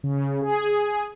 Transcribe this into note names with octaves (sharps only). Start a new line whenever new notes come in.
C#3
G#4